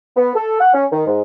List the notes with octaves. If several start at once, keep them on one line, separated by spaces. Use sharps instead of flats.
B3
A4
F#5
C#4
D#3
G#2